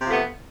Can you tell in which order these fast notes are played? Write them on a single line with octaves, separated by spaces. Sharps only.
C3 C4 F3 A3 B3